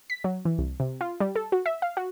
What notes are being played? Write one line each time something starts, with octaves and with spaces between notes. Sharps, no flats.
B6
F#3
E3
C2
C3
F4
G3
A4
F#4
E5
F5
F#4